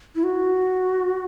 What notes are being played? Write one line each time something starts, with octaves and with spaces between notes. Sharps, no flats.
E4
F#4